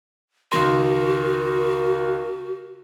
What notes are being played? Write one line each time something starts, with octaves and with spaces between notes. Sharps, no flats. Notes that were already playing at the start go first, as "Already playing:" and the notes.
C#2 D#3 F#4 A#4 C6